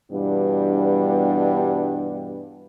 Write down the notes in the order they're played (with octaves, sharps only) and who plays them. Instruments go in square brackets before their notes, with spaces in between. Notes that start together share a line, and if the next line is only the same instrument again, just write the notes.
[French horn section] G2 B2 E3 G3 B3 D4